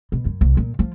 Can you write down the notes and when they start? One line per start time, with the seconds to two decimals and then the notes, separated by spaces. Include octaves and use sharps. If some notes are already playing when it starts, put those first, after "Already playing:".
0.12 B2
0.25 F#2
0.41 C2
0.57 A#2
0.79 F3